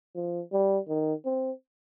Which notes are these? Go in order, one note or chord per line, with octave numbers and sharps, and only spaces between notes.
F3
G3
D#3
C4